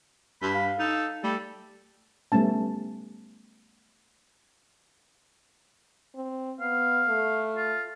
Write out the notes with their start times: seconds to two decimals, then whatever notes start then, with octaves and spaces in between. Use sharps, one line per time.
0.42 G2 B5
0.54 F5
0.79 D#4 A4
1.23 G3 A3 A4
2.32 G3 A3 B3 C#4 A5
6.15 C4
6.60 B3 F5
7.08 A3
7.56 F4